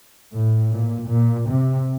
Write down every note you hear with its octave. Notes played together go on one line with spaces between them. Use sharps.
A2
A#2
A#2
C3